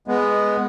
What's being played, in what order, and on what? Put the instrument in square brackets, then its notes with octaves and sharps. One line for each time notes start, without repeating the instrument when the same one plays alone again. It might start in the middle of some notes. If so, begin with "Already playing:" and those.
[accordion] G#3 B3